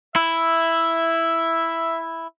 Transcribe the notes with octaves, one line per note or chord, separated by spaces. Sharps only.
E4 E5